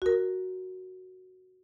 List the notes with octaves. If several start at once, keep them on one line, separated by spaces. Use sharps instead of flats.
F#4 A#4